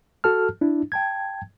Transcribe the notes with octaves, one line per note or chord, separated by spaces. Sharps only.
F#4 A4 A5 F6
D4 E4
G5 A5 G#6